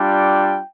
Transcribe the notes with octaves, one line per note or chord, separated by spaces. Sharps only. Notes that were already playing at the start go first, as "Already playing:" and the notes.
Already playing: G3 D4 F4 G5